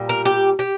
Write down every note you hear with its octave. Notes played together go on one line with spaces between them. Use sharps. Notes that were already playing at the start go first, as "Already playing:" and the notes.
Already playing: A#2 G3
A#4
G4
G4